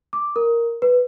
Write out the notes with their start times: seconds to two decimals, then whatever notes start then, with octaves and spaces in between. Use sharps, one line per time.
0.13 D6
0.36 A#4
0.82 B4